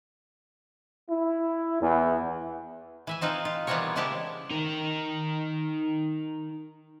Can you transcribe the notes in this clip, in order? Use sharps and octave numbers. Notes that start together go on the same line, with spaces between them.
E4
E2
E3 E5 G#5
C4 D#4 F4 B4
F4
E3 G3 B3 C4 A#4 C#5
C#3 G#3 C4 E4 G4 A5
D#4 A#4